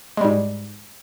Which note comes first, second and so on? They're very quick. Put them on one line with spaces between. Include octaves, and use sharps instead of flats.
G#3 G3 G#2